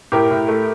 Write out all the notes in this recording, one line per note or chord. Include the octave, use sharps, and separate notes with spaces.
A2 G4 A#4
A2
A3